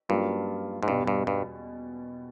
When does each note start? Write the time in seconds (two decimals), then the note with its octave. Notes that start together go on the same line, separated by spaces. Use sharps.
0.09 G2 F#3 A#3 C#4 F4
0.83 G#2
0.88 E2 G2 B2 G3
1.07 G2
1.27 G2